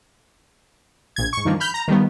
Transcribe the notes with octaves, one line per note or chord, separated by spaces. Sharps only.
A#1 G#6
G#2 C#6
G2 D#3 F3 A#3
B5 F6 G6
A#5
D#3 F3 G3 B3